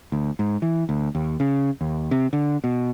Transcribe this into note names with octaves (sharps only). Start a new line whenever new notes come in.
D2
G#2
E3
D2
D#2
C#3
D#2
C3
D3
B2